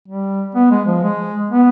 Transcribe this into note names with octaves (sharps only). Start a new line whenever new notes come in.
G3
B3
G#3
F3
G#3
B3